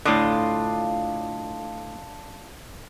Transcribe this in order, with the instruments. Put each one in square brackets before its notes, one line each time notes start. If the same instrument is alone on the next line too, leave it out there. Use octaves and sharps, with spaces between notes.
[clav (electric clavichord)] A2 D3 [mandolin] D4 F4 D#5